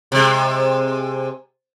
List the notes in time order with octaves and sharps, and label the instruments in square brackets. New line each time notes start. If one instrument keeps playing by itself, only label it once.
[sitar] C3 G#3